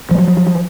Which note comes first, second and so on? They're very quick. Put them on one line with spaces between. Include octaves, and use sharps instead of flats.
F3 G#3 F#3